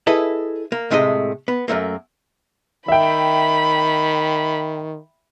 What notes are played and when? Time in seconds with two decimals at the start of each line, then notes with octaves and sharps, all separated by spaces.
0.07 E4 G#4 A4 B4 D#5
0.72 A#3
0.91 A2 C3 G#3 A3 F#4 D#5
1.48 B3
1.68 F#2 B2 A3 A#3
2.88 D#3 E5 G5 B5